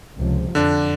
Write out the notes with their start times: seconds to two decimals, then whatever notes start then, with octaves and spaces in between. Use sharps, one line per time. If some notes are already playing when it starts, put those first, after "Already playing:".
0.18 C#2 C3 F3
0.55 F2 D3 D4